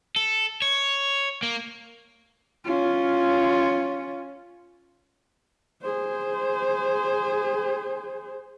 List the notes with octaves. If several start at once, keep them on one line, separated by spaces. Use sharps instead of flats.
A4
C#5
A#3
C#4 F4
G#4 C5